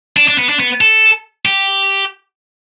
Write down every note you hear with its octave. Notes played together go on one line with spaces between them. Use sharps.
D4
D4
B3
D4
B3
A4
G4